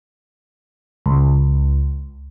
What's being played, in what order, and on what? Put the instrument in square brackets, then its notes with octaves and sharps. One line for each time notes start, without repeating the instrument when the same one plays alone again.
[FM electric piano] C#2